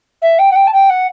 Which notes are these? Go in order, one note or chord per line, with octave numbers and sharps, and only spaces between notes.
E5
G5
F#5
G5
A5
G5
F#5